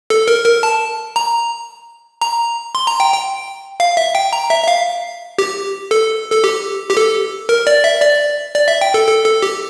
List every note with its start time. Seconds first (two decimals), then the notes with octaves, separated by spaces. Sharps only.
0.10 A4
0.28 A#4
0.45 A#4
0.63 A5
1.16 A#5
2.21 A#5
2.75 C6
2.87 A#5
3.00 G5
3.13 G5
3.80 F5
3.97 E5
4.15 G5
4.33 A#5
4.50 E5
4.63 E5
4.68 F5
5.38 G4
5.91 A4
6.32 A4
6.44 G4
6.90 G4
6.97 A4
7.49 A#4
7.67 D5
7.84 E5
8.02 D5
8.55 D5
8.68 E5
8.81 G5
8.94 A4
9.07 A4
9.25 A4
9.42 G4